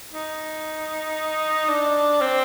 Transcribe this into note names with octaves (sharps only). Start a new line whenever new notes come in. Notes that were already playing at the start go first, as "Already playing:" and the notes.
D#4
D4
C4